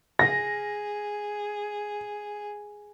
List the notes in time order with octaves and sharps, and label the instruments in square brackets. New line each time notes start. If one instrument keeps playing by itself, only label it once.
[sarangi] G#4 [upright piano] A#6